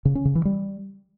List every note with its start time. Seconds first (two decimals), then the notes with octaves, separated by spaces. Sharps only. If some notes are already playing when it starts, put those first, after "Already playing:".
0.05 C#3
0.15 C#4
0.25 C#3
0.35 E3
0.45 G3